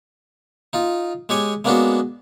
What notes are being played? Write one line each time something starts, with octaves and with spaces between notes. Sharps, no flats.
D#4 F4
G#3 G4 C#5 G#5
G#3 A#3 B3 C#4 D4 F#4